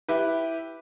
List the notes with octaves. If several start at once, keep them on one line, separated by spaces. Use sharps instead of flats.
E4 G4 B4